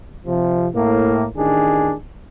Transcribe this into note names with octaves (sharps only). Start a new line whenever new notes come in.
C3 F3
A2 A#3
A1 D#3 D4 G#4